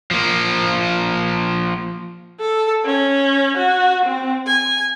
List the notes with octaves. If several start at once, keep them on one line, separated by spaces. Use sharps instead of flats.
F3 A#3
A4
C#4
F#4
C4
G#5